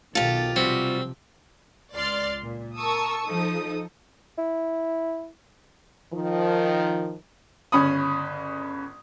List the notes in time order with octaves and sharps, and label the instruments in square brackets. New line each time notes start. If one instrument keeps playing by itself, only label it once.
[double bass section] B1 B2 D#3 [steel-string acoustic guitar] F4 G4 [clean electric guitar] A4
[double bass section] C3 F3 [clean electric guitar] G3 F#4 [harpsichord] C4
[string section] C#2 D5 C6 F6 A6
A#2
A#4 A5 C#6 D#6 E6
F3 D#4 A4 D#6
[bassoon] E4
[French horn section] D#3 F3
[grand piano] G1 C#3 C#4 B5 D#6